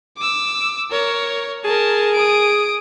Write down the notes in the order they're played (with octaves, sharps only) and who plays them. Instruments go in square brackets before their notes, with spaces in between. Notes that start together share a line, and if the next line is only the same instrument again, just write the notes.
[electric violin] D6 E6
A#4 C#5
[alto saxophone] G#4 [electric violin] A#4 A5
[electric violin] D#6 D7